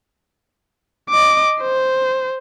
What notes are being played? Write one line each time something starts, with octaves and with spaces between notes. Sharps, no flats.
D#5 D6
C5